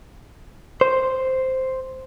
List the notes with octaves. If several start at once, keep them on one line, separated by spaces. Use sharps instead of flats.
C5